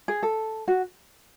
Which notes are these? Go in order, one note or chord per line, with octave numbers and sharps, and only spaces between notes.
G#4
A4
F#4